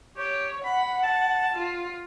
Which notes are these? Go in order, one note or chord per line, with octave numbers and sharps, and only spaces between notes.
G4 C#5
F#5 B5
A5
F4